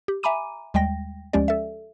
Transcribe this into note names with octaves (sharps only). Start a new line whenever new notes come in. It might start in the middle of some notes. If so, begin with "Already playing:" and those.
G4
E5 G#5 A#5 B5 D6 D#7
D#2 G3 G#3 G5 A#6
D2 F3 G#3 C#4 G4 D5
A4 E5